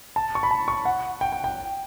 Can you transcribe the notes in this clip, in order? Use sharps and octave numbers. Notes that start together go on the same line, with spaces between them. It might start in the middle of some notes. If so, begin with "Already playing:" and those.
A5
C#6
B5
A5
C#6
F#5
G5
G5
G5